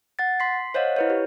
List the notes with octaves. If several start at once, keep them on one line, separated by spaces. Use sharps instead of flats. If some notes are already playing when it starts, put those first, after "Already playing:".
F#5 A6
C6 B6 C7
C5 C#5 D#5 F5 F#5
E4 B4 C#5
G4